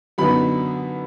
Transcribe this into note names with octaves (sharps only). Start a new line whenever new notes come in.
F#2 D3 F#3 B3 D#4 B5